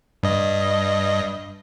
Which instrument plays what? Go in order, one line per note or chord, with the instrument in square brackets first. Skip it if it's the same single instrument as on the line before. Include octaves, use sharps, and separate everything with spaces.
[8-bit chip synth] G2 D#5